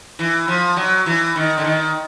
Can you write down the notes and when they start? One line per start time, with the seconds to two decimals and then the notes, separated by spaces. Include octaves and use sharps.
0.19 E3
0.48 F3
0.77 F#3
1.06 E3
1.36 D#3
1.58 D3
1.64 D#3